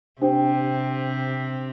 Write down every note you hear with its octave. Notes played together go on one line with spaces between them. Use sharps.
C3 D4 G4 C5 G5